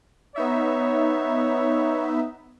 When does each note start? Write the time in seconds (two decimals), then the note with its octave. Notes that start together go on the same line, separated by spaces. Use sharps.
0.36 B3 D#4 C#5 E5